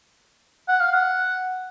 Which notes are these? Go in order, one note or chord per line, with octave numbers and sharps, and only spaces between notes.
F#5
F5
F#5